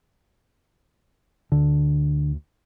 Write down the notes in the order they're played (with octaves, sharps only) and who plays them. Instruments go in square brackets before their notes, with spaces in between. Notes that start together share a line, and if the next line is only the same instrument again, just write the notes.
[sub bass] D2 [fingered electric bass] D3